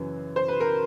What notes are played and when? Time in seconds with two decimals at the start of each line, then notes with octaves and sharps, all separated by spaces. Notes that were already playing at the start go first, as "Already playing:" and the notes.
Already playing: F#2 C#3 E3
0.36 C5
0.48 B4
0.60 A#4